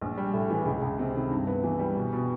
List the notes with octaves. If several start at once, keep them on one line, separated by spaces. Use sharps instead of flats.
A#1
G3
A2
E3
C#2
C#2
C3
D#3
G2
B3
E3
G3
B2
B2